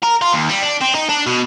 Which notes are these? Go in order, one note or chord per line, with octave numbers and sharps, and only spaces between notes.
A#4
F4
D#2
G3
D4
C4
D#4
D4
B2